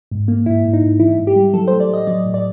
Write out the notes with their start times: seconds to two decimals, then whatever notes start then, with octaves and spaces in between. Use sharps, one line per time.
0.11 G#2
0.28 A#3
0.46 G#2 E4
0.65 G#2
0.73 D#4
0.82 G#2
1.00 E3 E4
1.19 G#2
1.27 G4
1.36 G3
1.54 F#3 A4
1.68 C5
1.72 A2
1.80 D5
1.90 A2 D#5
2.07 F#3 D5
2.25 A2
2.34 D5